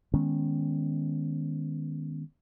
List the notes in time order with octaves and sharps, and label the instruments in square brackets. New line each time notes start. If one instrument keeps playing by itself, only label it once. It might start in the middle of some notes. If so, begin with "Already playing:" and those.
[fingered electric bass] D#3 G#3 B3 C#4